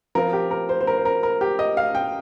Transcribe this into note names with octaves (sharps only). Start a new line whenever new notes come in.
F3 C4 F4 A#4
G4
A#4
C5
C5
A#4
C5
A#4
A#4
G4
D#5
F5
G5